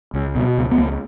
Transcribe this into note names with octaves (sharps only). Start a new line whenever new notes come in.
C#2
B2
C#2
B3
C#2 A#3